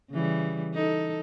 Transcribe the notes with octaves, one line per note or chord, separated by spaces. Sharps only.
C#3 E3 G3
D#4 A4